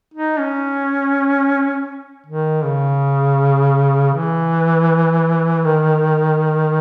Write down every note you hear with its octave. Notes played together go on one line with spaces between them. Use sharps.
D#4
C#4
D#3
C#3
E3
D#3